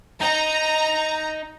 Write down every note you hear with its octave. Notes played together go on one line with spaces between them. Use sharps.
D#4 D#5 A#5